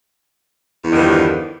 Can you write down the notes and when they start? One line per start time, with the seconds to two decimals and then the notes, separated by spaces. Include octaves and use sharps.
0.84 E2
0.87 D#3
0.91 D3
0.94 G2
0.98 F3